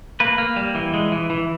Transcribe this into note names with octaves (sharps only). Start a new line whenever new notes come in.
A#3 B4
A#3
G3
E3
G#3
E3
E3